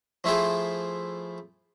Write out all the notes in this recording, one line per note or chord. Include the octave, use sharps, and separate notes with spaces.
F3 A3 E4 F4 G#4 C5